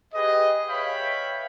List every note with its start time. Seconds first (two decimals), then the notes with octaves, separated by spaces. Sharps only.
0.13 G4 G#4 B4 D#5
0.69 B4 C#5 E5 F5 G5 B5